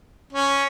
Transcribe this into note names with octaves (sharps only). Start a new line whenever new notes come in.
C#4